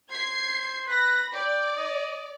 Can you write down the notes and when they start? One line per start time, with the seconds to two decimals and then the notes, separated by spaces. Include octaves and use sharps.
0.11 C5 G#6 C7
0.88 B4 B5 A#6
1.34 D5 G5
1.77 D#5